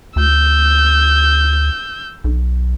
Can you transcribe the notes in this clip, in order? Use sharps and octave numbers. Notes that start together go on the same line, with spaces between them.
D2 E6 G6
B1